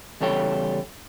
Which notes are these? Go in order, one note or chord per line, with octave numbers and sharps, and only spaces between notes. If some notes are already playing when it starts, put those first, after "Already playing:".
E2 C#3 G3 A4 C#5 G5